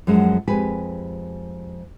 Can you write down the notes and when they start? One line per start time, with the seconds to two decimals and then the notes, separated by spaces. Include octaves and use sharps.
0.07 F#2 F3 F#3 G#3
0.48 F2 G#3 G4 B4 G#5